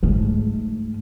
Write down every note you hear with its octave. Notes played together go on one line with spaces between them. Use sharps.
G#2 A3